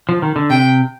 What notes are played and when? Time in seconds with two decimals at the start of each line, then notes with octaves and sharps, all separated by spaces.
0.09 F3
0.22 D#3
0.36 D3
0.50 C3 G5